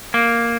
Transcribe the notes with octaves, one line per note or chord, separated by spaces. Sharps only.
A#3